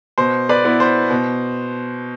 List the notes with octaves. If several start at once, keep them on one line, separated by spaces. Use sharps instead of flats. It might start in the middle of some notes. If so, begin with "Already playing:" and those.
B2 C5
B4 D5
B3 E4
C5
B2